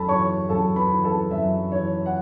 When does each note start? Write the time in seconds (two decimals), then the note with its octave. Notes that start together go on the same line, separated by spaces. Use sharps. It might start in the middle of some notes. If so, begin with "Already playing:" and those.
Already playing: F#2 A4 A5 B5
0.08 E3 C#5 C#6
0.49 F#2 A4 A5
0.76 B4 B5
0.91 E3
1.04 A4 A5
1.31 F#2 E5
1.72 E3 C#5
2.06 F#5